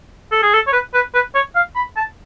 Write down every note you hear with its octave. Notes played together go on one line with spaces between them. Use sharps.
A4
G#4
A4
C#5
B4
B4
B4
C#5
F5
B5
A5